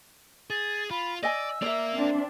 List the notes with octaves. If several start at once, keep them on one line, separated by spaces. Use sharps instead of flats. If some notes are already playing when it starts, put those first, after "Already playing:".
G#4 A6
F4 B5
D5 D#5 G#5 E6
A#3 A#4 D5 E5
C4 D4